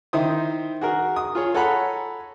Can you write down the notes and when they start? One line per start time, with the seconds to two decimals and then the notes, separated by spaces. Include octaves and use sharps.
0.13 D#3 D#4 E4 C5 D#6
0.81 F#4 G#4 A#4
1.16 D#6
1.35 F4 G#4 C#5
1.54 A4 C#5 F#5 G#5 A#5 B5